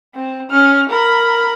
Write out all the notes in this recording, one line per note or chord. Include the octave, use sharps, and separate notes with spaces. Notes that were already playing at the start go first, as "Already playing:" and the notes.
C4
C#4 F6
A#4 B5